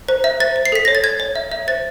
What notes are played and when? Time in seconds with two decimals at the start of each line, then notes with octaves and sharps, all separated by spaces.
0.08 C5
0.24 E5
0.40 C5 A6
0.56 C5
0.65 C7
0.72 A4 B6
0.85 C#5 A#6
0.95 A6
1.04 C#5 G#6
1.20 C#5
1.35 E5
1.52 E5
1.68 C5 A6